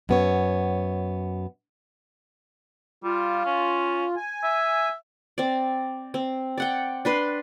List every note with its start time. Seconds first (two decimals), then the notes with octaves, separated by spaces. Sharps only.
0.09 F#2 B3 C#5
3.04 G3 F4
3.46 C#4
4.16 G#5
4.44 E5
5.38 C4 D5
6.14 C4
6.58 D5 F#5 G5
7.05 D4 B4 C6